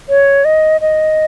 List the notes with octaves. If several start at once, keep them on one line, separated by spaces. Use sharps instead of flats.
C#5
D#5
D#5